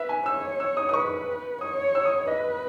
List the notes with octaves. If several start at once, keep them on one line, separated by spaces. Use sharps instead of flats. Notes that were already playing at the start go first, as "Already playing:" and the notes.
Already playing: B4 E5
G#5
C#5 E6
E6
D#6
D#6
B4 C#6
C#5 D#6
E6
D#6
B4 D#5